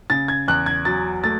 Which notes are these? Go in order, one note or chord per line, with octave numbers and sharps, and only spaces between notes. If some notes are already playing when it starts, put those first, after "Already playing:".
C#3 A6
G#6
E2 F#6
G#6
F#3 A6
A3 A6